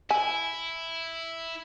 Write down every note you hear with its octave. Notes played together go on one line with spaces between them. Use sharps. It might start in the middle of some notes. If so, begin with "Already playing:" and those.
E4 G#5